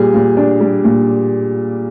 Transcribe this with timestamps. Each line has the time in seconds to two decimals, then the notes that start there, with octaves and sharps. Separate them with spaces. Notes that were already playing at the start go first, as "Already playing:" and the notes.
Already playing: A#2 G3 G#4
0.14 A#2
0.37 D4
0.61 G3
0.84 A#2